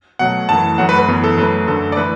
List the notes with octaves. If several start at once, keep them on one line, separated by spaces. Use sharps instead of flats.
B2 F#3 A3 F#5
F#2 E3 A3 A5
F#2 F#3 A3 F#5
B4
B4
F#2 E3 B3
A4
F#2 F#3 A3 B4
F#2 D3 A3 A4
D5
E3 A3 B4